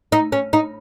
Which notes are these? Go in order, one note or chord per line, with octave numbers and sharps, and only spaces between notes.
D#4
C#4
D#4